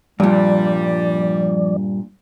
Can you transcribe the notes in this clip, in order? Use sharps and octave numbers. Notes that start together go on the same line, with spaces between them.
G2 A#2 F3 G3 D5